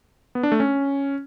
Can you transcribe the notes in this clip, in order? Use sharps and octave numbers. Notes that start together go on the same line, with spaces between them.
B3
D4
A3
C#4